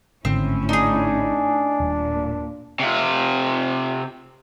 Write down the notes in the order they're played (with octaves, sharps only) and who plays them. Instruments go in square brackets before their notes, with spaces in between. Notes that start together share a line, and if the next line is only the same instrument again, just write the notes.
[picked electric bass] G#1 D3 [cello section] A2 C#4 E4 [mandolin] C4
[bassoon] D4 [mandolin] D#4 G#4
[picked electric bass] D#1 [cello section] A#2
[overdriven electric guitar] C3 F4